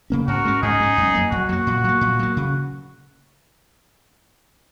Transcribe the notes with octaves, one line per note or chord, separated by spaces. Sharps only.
C#3 A#3 C#4
G#2 F#4 A#4
G#3 C#4
G#2 D#4 G#4
G#3 C#4
F#2
F#3 A#3
F#2 F#4
F#3 A#3
A#2
F#3 A#3
A#2
F#3 A#3
C#3